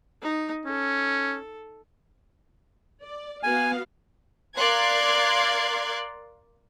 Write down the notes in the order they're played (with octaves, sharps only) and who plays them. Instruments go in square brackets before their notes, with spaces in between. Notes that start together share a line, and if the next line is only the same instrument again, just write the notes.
[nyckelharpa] D#4
[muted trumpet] C#4 [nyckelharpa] A4
[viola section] D5
[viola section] B3 F#4 F5 [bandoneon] G#5
[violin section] A#4 D5 F5 C6 F#6 G#6